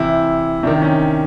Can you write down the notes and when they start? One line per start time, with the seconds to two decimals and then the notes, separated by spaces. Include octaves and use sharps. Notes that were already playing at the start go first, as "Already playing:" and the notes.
Already playing: C3 E3 E4
0.63 C3 D4
0.67 D#3
0.82 C#4